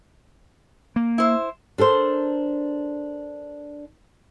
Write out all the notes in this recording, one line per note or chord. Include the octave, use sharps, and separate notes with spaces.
A#3
E4 C5
D4 A4 A#4 C5